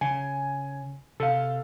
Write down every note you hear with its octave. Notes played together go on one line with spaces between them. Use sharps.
C#3 G#5
C3 A4 F5